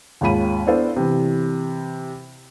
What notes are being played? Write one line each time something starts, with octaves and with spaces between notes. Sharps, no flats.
D#2 G#2 C#4 F4 B5 D#7
B3 D4 E4 A4 C5 F5
C3 E3